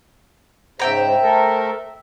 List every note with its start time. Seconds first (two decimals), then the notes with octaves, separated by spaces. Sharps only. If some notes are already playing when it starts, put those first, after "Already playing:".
0.80 G#2 C#3 C5 E5 G5 A#5
1.22 A3 A4 A#4